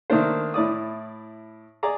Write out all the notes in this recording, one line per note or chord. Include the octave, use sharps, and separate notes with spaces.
D#3 A3 A#3 D4 C5
A2 E4 D5 D#6
G#4 D5 A#5